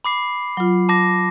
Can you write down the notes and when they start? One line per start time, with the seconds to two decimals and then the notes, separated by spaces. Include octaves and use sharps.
0.05 B5 D6 C7
0.57 F#3 F4
0.89 A5 D6 A#6